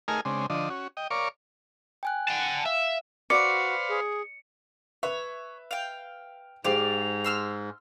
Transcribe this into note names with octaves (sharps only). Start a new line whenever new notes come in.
A3 D#4 G#4 A#4 G#5 F6
C#3 G#3 C4 D4
D3 F3 D4 D#5
C#4 F#4
D#5 G5
A#4 C#5 D5 F5 C#6 D6
G5 G#5 F#6
F#5 A5
E5 F5
F#4 B4 C5 D5 F5 C#7
G#4
B4 C#5 E5
F5 G5
G#2 G4 G#4 C5 D5 F5 F7
C6 E6 F6